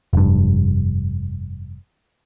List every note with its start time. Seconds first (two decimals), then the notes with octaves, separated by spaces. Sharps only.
0.13 F1 G2